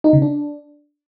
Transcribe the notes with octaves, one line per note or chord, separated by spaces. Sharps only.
D#4
C#3
D4